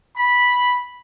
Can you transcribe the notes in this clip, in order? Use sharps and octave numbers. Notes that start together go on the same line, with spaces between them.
B5